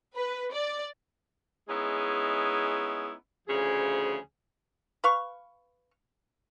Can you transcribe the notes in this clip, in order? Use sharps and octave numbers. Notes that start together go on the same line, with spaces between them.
B4
D5
G#3 B3 C#4 D#4 E4 G#4
D2 C#3 F3 G#4
B4 F5 C#6